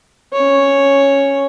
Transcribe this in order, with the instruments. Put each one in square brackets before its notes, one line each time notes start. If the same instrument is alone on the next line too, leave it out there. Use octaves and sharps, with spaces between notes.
[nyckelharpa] C#4 C#5